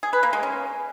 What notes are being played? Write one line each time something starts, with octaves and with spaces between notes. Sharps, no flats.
G#4
B4
A#3
G#3
C#4